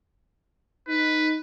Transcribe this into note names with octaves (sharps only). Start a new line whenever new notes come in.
D#4 B4